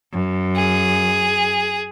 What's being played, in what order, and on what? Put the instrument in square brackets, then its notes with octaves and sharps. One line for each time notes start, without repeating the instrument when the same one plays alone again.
[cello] F#2
[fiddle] G#4